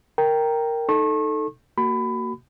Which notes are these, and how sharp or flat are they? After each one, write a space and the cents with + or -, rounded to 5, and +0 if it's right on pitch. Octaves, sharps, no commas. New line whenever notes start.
A#4 -5 G5 +0 A#5 +0
D#4 +0 A4 +0 C#6 -40
A#3 -15 F#4 +15 B5 +20